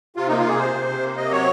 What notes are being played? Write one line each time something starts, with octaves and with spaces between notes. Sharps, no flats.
C3 F4
A#3 D#4
F4
C3 G#4
C3 C5
C3
C3
A#3
C3 D#5
F#3 C#5